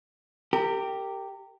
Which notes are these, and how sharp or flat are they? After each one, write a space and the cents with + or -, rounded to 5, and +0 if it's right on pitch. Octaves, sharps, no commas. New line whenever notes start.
G4 +0 A#4 -30